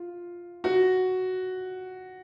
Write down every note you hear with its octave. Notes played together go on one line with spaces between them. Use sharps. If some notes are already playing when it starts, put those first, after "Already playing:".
Already playing: F4
F#4